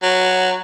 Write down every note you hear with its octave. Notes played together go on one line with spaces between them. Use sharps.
F#3